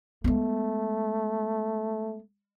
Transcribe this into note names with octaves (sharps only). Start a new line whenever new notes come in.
G#3 A3 B3